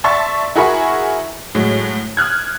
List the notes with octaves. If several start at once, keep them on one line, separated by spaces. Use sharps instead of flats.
D5 E5 A5 C6 C#6 A6
E4 F#4 G#4 A#4 B5 C#6
A2 F#3 G#3
D#6 F6 F#6 G#6